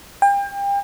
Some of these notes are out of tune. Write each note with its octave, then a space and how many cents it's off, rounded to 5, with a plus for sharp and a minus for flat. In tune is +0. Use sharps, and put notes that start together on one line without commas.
G5 +35